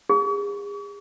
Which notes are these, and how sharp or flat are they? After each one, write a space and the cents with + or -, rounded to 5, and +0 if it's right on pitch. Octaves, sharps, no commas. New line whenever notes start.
G#4 -40